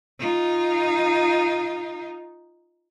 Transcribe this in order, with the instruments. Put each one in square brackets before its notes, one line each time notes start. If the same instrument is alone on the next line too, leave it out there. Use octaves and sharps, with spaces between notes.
[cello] D#4 F4